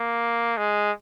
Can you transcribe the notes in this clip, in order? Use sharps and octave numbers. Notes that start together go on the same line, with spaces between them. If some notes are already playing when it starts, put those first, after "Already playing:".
Already playing: A#3
G#3